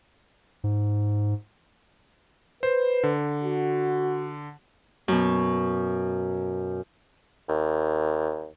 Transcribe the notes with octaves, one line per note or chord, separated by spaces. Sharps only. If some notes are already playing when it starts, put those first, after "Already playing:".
G#2
B4 C5
D3
F#4
F#2 B2
D#2